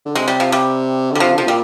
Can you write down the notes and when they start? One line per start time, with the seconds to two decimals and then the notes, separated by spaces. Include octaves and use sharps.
0.06 D3
0.15 C3 G#3
0.28 G3
0.40 F3
0.52 G3
1.12 D3 G3
1.20 C3 F3
1.33 D3
1.38 C3 F3
1.47 A#2 G3